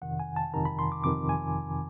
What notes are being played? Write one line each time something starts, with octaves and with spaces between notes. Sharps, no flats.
G1 F2 C3 D#3 F#5
G#5
A5
G1 F2 C3 D#3 A#5
B5
C6
D6
G1 F2 C3 D#3 D6
G#5